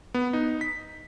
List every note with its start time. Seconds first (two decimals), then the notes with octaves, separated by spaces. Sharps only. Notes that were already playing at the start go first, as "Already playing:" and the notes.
0.14 B3
0.33 D#4
0.61 B6